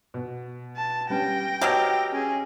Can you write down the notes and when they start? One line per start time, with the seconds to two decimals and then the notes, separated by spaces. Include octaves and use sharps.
0.14 B2
0.77 A5
1.10 G3 B3 C#4 G5 A#6
1.61 B2 F#3 G4 D#5 E6 F6
2.12 C#4 G#4